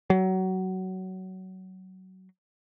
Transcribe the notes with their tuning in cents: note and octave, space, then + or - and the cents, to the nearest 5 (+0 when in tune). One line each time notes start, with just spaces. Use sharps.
F#3 +20